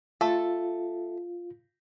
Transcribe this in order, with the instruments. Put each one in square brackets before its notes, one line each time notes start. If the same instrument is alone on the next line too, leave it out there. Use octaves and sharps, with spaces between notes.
[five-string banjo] A3 A4 [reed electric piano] F4